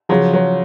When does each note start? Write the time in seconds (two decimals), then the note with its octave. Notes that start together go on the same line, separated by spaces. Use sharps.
0.09 C#3 F3 F#3
0.33 F#3